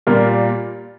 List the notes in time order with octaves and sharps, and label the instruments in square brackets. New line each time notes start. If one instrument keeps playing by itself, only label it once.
[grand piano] A#2 G3 A#3 F4 A#4